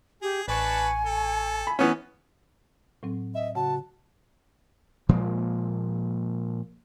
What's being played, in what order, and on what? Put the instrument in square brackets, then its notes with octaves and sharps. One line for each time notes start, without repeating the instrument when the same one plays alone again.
[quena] G4 [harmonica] G#4
[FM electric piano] A1 C#6 C#7 [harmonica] D4 B4 A5 [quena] G#5
[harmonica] A4
[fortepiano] B5
[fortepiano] E3 B3 C#4 [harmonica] D#4
[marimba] A2 F#3 C4
[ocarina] D#5 [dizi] E5
[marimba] C#3 F#5 [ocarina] F#4 [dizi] A5
[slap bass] A#2 F3 G#3 A#3